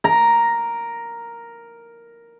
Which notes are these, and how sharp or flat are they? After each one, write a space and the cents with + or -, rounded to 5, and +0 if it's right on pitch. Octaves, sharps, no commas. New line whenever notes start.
A#4 +0 A#5 +0